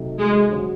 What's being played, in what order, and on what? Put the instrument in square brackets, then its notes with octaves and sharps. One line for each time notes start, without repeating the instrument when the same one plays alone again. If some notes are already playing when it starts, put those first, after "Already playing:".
Already playing: [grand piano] C3 F#3 A3 D#4
[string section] G#3
[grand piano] C#3 F#3 C#4 F#4